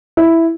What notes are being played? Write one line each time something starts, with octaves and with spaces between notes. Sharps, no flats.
E4